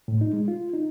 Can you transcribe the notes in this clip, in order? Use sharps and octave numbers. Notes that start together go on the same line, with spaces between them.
A2
D#4
G#3
F4
D#4